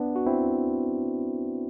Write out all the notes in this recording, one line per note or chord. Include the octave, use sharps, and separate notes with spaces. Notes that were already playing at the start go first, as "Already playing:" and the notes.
Already playing: B3 D4
F#4
C4 E4